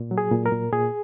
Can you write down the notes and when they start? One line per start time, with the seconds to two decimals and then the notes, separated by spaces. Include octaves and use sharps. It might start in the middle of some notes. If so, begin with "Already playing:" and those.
Already playing: A#2
0.11 F#3
0.18 G#4
0.31 A#2
0.46 A#4
0.52 A#2
0.72 A#2 G#4